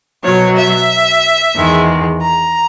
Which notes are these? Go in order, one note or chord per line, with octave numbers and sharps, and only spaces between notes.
B2 F#3 C#5
E5
E2 D#3 G#3
A#5